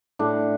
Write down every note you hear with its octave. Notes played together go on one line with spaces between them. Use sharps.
A2 D4